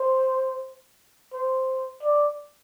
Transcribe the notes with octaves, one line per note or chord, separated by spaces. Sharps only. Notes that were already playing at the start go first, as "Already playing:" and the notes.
Already playing: C5
C5
D5